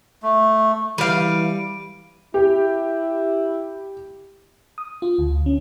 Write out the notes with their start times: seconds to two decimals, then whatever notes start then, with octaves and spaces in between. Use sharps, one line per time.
0.23 A3
0.98 E3 G3 F5 D7 D#7
2.34 E4 G4
4.78 D#6
5.02 F4
5.18 D2
5.46 C#4